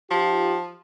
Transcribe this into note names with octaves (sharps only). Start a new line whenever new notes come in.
F3 D#4 F4 G4